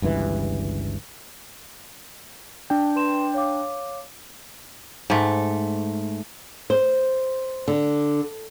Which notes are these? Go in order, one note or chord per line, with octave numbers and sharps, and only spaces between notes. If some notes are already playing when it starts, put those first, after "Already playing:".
G1 C#2 G2 E3
D4 G5 A5
B4 C6 E7
C#5 F5 D6
G#2 A3
C5
D3